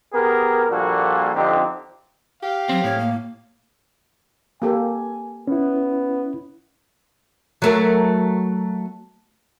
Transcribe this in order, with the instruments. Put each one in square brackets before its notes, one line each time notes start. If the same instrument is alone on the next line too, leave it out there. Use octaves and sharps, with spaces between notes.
[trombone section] B3 G4 G#4 A#4
A#1 A#2 G3 A#3 F#4 A4
F2 D3 C4 D#4 G4
[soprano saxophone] G4 [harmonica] F5
[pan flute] F#3 [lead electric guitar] C4
[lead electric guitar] A2 [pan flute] C#5
[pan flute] A#3
[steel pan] A#3 G4 A4 [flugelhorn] G#5
[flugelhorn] B3 [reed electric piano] C#4 E4
[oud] F#3 A3 A#4